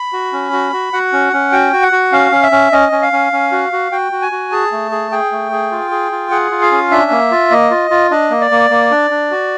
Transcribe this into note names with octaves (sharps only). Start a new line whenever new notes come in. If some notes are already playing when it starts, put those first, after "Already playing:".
Already playing: B5
F#4
C#4
F#4
F#4
F#4 F#5
C#4
C#4
F#4 G5
F#4
F#5
F#4
C#4 F5
C#4
E5
C#4
C#4 D#5
C#4
F5
C#4
C#4
F#4
F#4
F#4 G5
F#4
G#5
F#4
G#4 A5
A3
G#4
G#4 G5
A3
G#4
F4
G#4
F4
G#4 F#5
F4
F5
C#4
D4 E5
A#3
F4
A#3 D#5
F4
F4
D4 D#5
A#3
D5
A#3
A#3
D4
D4
F#4